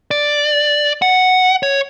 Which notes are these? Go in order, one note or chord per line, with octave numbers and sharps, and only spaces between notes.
D5
F#5
C#5